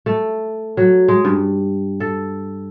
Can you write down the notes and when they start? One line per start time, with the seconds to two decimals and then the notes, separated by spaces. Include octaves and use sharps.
0.06 A3
0.77 F#3
1.08 G#3
1.25 G2
2.00 A4